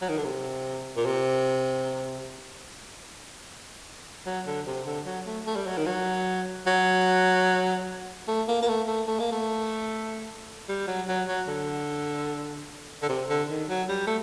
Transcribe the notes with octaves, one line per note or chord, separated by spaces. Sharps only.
F#3
D#3
D3
C3
A#2
C3
F#3
D3
C3
D3
F#3
A3
A3
G3
F#3
D#3
F#3
F#3
A3
A#3
A#3
A3
A3
A3
A#3
A3
G3
F#3
F#3
F#3
D3
D3
C3
D3
D#3
F#3
G3
A3